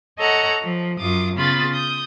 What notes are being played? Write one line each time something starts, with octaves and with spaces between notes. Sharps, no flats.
A4 C#5 D#5 F#5 A#5
F3
F#2 F4 D6 D#6
C#3 B3 F4 B5 A6
D#6 G6